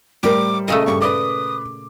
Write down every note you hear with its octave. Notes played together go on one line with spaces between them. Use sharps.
A2 G3 G4 A#4 C5 D6
A#2 C#3 A3 D#5
G2 C#6
B4 D5 D6 D#6